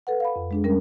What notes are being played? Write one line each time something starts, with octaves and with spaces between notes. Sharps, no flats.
A4 B4 F#5
F5 B5
F2
G#3 D4 G#4
G3 C#4 A#4